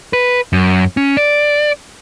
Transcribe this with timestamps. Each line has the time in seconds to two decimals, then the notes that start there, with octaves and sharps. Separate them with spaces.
0.13 B4
0.53 F#2
0.97 C#4
1.17 D5